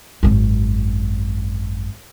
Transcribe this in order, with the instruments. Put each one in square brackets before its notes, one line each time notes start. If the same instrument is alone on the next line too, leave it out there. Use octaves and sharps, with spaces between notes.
[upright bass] G#1 F#2